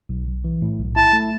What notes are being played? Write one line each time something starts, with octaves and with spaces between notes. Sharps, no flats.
B1
B1
E3
A2
B1
E4 A5
A3